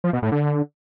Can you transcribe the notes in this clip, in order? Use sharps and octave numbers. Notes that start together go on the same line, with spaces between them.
F3
B2
A2
D3